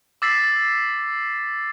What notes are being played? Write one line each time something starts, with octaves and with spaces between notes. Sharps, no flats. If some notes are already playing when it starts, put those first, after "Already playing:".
D6 E6 A6 B6 C7